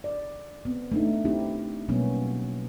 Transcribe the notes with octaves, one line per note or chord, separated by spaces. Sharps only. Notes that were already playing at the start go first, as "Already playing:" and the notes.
D5
B3 C4
A3 D4 D#4
C4 D#4 E4 G4
B2 F#3 G3 A#3 B3 C#4